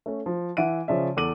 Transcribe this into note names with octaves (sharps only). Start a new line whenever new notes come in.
A3 C#4
F3
E3 E5 F#5 D7 D#7
C#3 F3 C#4 D5 E5
E2 A4 D6 D#7 F#7